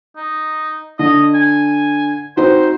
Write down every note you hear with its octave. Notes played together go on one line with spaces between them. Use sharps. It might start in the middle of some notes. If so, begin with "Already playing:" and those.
D#4
D3 D#5
G#5
C4 D#4 F#4 C5